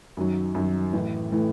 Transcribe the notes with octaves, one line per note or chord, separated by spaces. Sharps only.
F#2 D#3 F#3
F#2 D#3 F#3
A1 A2 E3 A3
A2 E3 A3